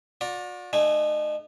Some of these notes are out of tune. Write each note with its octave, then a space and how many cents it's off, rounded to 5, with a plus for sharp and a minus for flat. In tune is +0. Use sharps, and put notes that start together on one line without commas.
F#4 -45 D5 +0 A#5 +0
A3 -35 D#4 -40 G#5 -10